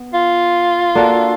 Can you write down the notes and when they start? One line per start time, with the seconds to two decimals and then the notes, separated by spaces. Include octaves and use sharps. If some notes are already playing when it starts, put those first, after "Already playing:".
Already playing: B3
0.14 F4
0.95 A#3 D4 F#4 A4